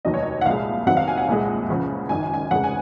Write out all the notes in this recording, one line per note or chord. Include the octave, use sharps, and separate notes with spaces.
F1 D#2 D#3 F#3 D#5
C#5
D#5
F#5
C2 A#2 G#3 F5
F1 F2 C3 D#3 F#3 F#5
F5
G#5
F#5
C2 A#2 G#3
C#2 C#3 F3
G#1 F#2 D#3 G#5
G#5
F1 F2 C#3 G#3 F#5
G#5